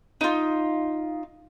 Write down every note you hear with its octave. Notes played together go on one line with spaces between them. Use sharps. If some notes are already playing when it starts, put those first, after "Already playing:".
D#4 F4